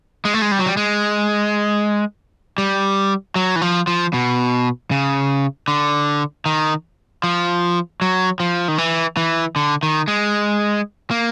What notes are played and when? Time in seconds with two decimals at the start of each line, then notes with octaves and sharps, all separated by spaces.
0.25 G#3
0.34 A3
0.42 G#3
0.51 G3
0.59 F#3
0.66 G3
0.77 G#3
2.58 G3
3.36 F#3
3.56 E3
3.62 F3
3.87 F3
4.13 B2
4.91 C#3
5.68 D3
6.46 D#3
7.23 F3
8.01 F#3
8.40 F3
8.68 D#3
8.78 E3
9.17 E3
9.56 D3
9.83 D#3
10.08 G#3
11.11 A#3